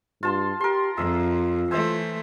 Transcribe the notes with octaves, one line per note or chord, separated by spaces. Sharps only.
G2 F4 A5 C6
G4 A#4 C6
F2 F4 G#4 E5
E3 A3 C5 E5 G#5